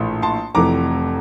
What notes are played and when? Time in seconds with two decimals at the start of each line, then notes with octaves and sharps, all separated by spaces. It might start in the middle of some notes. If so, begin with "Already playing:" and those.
Already playing: A#1 A2 E3
0.22 A5 C6
0.54 F1 F2 E3 A3 A#5 D6